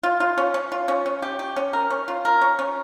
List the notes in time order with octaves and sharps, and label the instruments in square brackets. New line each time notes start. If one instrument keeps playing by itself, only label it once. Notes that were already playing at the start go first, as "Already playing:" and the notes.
[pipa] F4
F4
C#4
C#4
F4
C#4
C#4
G4
G4
C#4
A#4
C#4
F4
A#4
C#4
C#4